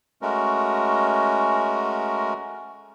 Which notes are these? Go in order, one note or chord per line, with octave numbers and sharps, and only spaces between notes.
G#3 A3 C#4 F#4 A#4